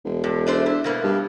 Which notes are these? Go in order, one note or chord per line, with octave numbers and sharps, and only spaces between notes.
E1
G2
A3 D4 C5
E4
B2 A#3 B3
G2